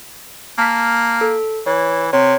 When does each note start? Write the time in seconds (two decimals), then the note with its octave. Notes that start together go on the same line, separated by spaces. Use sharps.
0.58 A#3 A5 F6 B6
1.21 A4
1.66 E3 C#5
2.13 C3 C#5